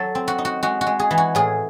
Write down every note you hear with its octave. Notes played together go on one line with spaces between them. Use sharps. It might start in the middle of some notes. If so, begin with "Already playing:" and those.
Already playing: F#3 A4
C4
F#4
D#4
F#4
G#3 F#4
F#4
G#3
G#4
E3
F#4
A2 G#4